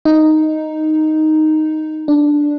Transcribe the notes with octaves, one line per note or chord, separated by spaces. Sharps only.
D#4
D4